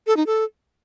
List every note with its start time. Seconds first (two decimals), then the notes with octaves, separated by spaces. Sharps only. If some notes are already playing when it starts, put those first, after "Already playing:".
0.07 A4
0.17 D#4
0.26 A4